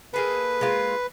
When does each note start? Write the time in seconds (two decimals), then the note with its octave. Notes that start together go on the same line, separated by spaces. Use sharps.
0.14 A#3 G#4 A4 B4
0.61 G#3 A#3 F4